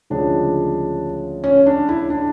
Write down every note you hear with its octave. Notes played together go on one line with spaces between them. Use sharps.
D2 C#3 F3 G#3 D4
C#4
D4
E4
D4